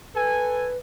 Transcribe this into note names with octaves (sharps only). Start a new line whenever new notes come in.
A4 B4 G#5